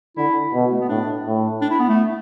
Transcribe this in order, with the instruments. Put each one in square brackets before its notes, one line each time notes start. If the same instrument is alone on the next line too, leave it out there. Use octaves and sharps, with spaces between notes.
[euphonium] D3 [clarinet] E4
[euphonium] B2
[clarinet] A3
B3
[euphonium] A2 [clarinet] D4
[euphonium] A2
[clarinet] D4
E4
B3
A3